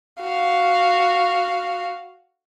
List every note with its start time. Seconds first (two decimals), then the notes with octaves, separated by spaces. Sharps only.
0.22 F#4 F5